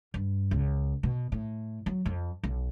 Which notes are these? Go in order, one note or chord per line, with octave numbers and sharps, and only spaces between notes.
G2
C#2
B2
A2
F#3
F2
B1